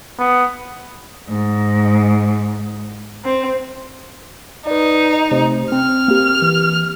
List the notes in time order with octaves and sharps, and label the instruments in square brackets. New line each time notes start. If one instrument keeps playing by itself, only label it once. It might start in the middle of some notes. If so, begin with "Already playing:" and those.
[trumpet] B3
[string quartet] G#2
C4
[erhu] D#4 [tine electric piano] B4 D5
[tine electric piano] C3 A3 [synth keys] C5
[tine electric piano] C4 [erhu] F6
[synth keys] A#3 G4
[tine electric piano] E3